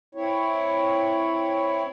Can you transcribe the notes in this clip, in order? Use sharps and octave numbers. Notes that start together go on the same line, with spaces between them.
C4 E4 C#5